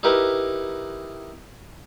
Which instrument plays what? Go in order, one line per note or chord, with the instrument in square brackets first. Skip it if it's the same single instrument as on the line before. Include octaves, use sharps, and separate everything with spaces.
[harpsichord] D#4 E4 G4 A#4 B4